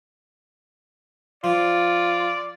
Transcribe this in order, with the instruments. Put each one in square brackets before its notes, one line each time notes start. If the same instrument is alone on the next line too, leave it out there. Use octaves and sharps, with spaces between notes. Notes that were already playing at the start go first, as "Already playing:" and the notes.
[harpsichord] F3 [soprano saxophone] F4 [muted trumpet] D5